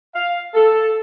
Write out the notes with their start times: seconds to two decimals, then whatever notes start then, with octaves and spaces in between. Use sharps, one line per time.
0.14 F5
0.55 A4